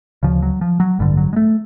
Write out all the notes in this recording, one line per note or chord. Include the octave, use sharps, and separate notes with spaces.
D2 C#3 F3
F#3
F3
F#3
A1 G2 D3 G3
F#3
G#3
A3